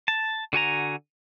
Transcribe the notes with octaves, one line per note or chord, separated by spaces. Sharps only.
A5
D3 F#4 G#5 A#5